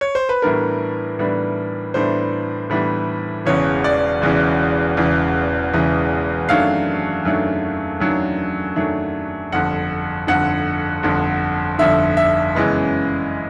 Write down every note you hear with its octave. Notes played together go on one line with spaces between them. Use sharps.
C#5
C5
B4
A2 E3 G3 B3 D4 A#4
A2 E3 G3 B3 D4
A2 E3 G3 B3 D4 C5
A2 E3 G3 B3 D4
E1 E2 C#3 E3 C#5
D5
E1 E2 C#3 E3
E1 E2 C#3 E3
E1 E2 C#3 E3
F#2 D#3 F#3 A3 D4 F5
F#2 D#3 F#3 A3 D4
F#2 D#3 F#3 A3 D4
F#2 D#3 F#3 A3 D4
G1 F2 D3 F#5
G1 F2 D3 F#5
G1 F2 D3
G1 F2 D3 E5
E5
F#2 C#3 E3 G#3 B3